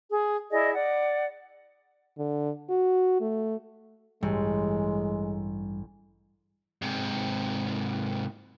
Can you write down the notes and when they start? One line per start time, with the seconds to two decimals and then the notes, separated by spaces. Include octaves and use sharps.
0.11 G#4
0.51 E4 G#4 D5 D#5
0.73 D5 F#5
2.18 D3
2.69 F#4
3.21 A3
4.23 A1 G2 G#3
6.82 G#2 C3